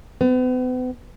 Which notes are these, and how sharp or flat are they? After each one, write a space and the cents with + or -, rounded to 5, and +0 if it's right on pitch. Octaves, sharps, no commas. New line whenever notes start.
B3 +40